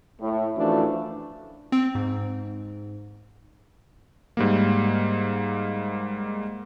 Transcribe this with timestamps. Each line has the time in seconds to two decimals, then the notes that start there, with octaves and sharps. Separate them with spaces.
0.21 A2
0.57 F#2 E3 F3 A3 D4
1.72 C4
1.95 G#2
4.37 G#2 G3 A#3